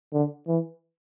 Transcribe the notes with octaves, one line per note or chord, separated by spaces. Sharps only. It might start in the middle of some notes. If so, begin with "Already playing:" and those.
D3
E3